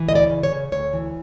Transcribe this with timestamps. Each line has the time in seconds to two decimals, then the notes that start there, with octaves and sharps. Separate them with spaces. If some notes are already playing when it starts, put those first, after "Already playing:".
Already playing: E3
0.08 D2 D#5
0.15 D5
0.29 C#3
0.43 C#5
0.52 C#3
0.72 D2 C#5
0.93 E3